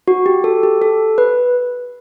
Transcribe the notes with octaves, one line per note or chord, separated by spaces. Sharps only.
F#4
G4
A4
G4
A4
B4